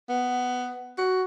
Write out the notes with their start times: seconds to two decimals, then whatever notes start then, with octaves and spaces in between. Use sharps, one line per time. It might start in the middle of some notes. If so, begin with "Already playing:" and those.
0.09 B3
0.98 F#4